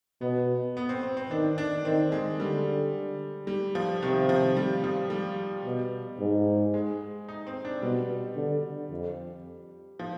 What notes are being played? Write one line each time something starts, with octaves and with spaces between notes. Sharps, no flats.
B2 B3
B3
C4
C4
C4
D#3 D4
D4
D#3 C4
G#3
D3 G3
G3
F3
C3 D#3
F3
G3
F3
G3
B2
G#2
G#3
D#4
C4
D4
B2 G3
D3
F2
F3